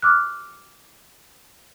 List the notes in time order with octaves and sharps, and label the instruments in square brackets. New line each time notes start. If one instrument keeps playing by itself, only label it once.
[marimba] D6 F6 F#6